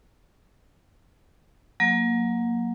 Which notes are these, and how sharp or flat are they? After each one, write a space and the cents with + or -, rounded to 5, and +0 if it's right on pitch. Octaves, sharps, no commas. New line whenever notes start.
F#3 -25 A#3 +0